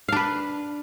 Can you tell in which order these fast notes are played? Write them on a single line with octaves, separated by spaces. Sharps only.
F5 D4 B4